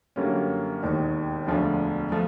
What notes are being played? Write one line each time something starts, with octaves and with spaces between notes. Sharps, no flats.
F#2 D3 G3 A#3 C#4
E1 D#2 D#3
E1 D2 D3 F3
F3 A3